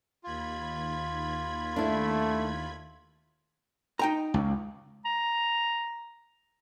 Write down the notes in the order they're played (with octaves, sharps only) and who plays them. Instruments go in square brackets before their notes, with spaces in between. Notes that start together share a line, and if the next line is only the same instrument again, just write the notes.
[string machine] D#2 B5 G#6 [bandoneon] F4
[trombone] A3 [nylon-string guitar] D4 E4
[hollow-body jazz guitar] D#4 G5 A#5
[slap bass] C#2
[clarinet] A#5